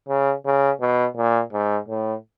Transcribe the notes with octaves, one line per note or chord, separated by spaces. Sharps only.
C#3
C#3
B2
A#2
G#2
A2